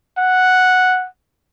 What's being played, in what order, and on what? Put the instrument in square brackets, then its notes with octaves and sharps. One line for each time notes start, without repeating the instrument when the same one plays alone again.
[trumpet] F#5